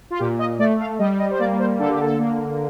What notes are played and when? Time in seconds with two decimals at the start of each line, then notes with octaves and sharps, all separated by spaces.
0.10 F4
0.19 A#2 G4
0.39 D#5
0.59 A3 D5
0.79 F5
0.99 G3 D#5
1.19 D#5
1.31 C5
1.38 A#3 D5
1.59 C5
1.79 D3 A4
1.89 G4
2.00 A4
2.19 A#3